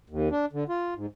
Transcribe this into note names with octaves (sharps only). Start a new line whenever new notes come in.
D#2
D4
D3
F4
G#2